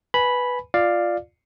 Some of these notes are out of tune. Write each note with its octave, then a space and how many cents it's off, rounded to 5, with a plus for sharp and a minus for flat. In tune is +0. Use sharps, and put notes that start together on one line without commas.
B4 +0 G#5 +20 B5 -5
F4 +0 D5 +10 F5 +0